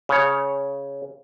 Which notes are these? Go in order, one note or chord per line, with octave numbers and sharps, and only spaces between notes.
C#3 C#5